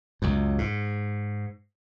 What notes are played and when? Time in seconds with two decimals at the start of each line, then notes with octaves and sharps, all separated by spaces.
0.22 C#2 F#2
0.58 G#2